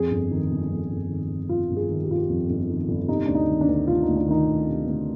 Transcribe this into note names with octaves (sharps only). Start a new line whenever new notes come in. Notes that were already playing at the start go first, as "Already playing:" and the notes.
Already playing: F2 G#4
G1
D#3
G1
F2
G1
D#3
G1
F2 F4
G1
G#4
D#3
G4
G1 F4
G4
F2
G1
D#3
G1
C3 D#4
D2 D4
D#4
D#3
D4
D2
C3 F4
D#4
D2
D4
D#3 D#4
D2
C3
D2